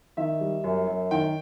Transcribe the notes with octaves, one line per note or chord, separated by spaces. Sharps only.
D#3 E5
G3
F#2
F#2
D#3 G5